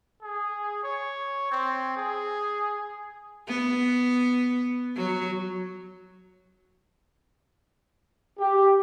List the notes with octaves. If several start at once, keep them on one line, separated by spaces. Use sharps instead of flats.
G#4
C#5
C4
G#4
B3
F#3
G4